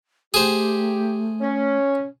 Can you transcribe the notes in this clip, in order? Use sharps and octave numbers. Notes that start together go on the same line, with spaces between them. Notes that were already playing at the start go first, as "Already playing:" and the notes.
A3 G4 G#4 C5
C#4